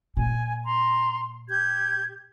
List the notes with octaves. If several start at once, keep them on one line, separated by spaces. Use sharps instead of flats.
A#2 G#5
A#5 C6
G4 G6 G#6